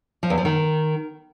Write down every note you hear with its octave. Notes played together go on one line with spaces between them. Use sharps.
F3
E2
F3
D#3